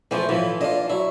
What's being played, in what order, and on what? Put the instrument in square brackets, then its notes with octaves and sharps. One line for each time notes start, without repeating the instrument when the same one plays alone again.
[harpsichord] E3 A3 [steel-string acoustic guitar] F3 C4
[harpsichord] A2 F3 [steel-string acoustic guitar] E3
[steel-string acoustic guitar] D4 [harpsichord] F4 D#5
[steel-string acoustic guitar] F#3 [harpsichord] E4